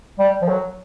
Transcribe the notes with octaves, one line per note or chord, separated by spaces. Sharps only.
G3
F3
F#3